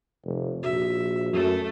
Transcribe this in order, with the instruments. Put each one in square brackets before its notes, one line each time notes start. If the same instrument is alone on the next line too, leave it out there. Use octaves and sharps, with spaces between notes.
[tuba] F1
[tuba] A#1 [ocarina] F#4 [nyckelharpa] E5
[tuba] F#2 [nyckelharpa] A3 A4